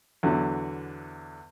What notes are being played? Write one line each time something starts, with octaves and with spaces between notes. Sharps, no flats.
E2 D3 F#3